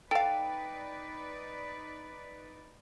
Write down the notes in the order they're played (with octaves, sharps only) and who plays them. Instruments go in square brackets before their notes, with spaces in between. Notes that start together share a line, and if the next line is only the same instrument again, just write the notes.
[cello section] D#4 B4 D5 [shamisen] A4 F5 [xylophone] G5